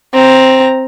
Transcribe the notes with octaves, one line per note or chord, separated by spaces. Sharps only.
C4 A#5